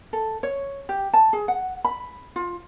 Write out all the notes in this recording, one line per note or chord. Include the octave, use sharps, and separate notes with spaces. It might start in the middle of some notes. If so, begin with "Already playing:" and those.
A4
C#5
G4
A5
G#4
F#5
B5
F4